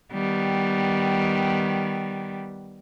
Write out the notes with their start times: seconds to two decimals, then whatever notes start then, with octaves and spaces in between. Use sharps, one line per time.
0.13 D#3 G3 B3